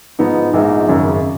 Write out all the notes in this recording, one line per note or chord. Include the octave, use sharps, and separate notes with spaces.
G#2 F3 B3 D#4
A#1 G#2 F3 G#3 D#4
G#1 F#2 C#3